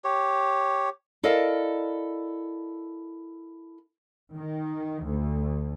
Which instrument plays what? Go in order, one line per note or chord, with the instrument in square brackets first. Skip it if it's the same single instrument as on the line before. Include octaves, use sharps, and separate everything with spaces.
[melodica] G4 C#5
[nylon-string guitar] E4 A4 A#4 D5 D#5 F5
[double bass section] D#3
D2